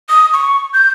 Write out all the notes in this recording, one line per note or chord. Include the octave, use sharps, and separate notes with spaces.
D#6
C#6
G6